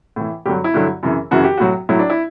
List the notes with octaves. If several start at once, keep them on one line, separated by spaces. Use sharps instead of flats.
A2 E3
G2 D3 F#3 G4
E4
G2 D3 F#3
F#2 C#3 E3
F#2 C#3 E3 F#4
G4
A2 F#3 F#4
A2 F#3 E4
D4
E4